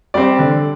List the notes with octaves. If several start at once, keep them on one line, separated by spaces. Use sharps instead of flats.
G3 C4 D5
D3